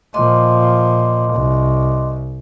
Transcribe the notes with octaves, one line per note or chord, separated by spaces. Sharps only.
A#2 F3 D#5 C6 D6
C2